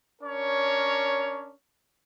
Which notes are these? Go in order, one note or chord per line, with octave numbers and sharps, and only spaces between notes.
C#4 D4 A#4 C#5